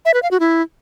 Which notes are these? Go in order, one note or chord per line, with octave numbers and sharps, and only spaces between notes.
E5
B4
F5
F#4
E4